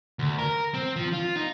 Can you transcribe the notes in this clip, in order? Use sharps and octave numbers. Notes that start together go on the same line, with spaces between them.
D2
A#4
C4
F3
F4
D#4